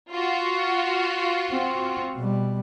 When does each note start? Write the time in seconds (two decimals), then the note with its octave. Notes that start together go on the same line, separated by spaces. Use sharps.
0.11 F4 F#4
1.50 C4
2.15 B2 G3